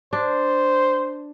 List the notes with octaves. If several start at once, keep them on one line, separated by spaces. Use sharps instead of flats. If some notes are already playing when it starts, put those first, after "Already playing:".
D4 C5